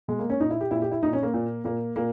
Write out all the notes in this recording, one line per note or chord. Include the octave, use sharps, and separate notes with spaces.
B2 G#3
A#3
C#4
A#2 D#4
E4
G4
A#2 E4
G4
E4
A#2 D#4
C#4
A#3
A#2
A#2 A#3
A#2 A#3